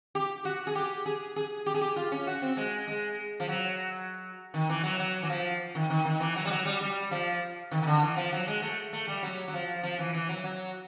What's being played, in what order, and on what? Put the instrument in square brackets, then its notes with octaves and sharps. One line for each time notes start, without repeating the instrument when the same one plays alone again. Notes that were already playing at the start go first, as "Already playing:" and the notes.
[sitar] G4
F#4
G#4
G4
G#4
G#4
G4
G#4
G4
F4
C#4
F#4
C4
G#3
G#3
F3
F#3
D#3
E3
F#3
F#3
E3
F3
D#3
D#3
D#3
E3
F#3
G3
F#3
G3
G3
F3
D#3
D#3
D3
E3
F3
F#3
G#3
A3
A3
G3
F#3
F#3
F3
F3
E3
E3
F#3
F#3